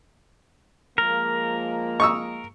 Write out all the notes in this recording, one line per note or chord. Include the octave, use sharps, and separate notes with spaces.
F3 G#3 A#3 A#4
C#6 D#6 E6